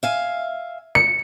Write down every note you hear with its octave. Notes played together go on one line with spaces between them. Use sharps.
E5 F5 G#5
C#7